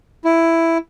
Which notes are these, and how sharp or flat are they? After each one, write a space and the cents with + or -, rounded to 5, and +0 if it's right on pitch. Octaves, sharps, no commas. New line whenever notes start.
E4 +5